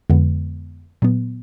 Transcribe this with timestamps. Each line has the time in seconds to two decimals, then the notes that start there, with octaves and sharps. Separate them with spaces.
0.10 F2 D3 G#3 B3
1.02 A#2 F#3 B3